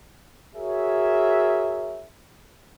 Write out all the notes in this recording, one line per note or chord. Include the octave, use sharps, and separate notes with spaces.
F#4 G#4 A#4 C#5 E5